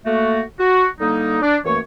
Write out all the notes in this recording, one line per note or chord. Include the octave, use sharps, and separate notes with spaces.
A3 A#3 F#4
F#4
D3 G3 A#3 D#4
D4
F#2 E3 A3 A#3 C#5